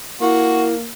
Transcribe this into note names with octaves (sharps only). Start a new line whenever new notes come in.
A#3 E4 F#4